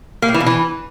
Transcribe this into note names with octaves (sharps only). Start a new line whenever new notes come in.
A#3
A2
E3
B2
E3